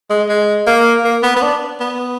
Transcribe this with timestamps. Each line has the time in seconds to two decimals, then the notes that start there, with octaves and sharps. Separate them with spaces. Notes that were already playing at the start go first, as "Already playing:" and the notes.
0.10 G#3
0.29 G#3
0.67 A#3
1.04 A#3
1.23 B3
1.36 B3
1.42 D4
1.80 B3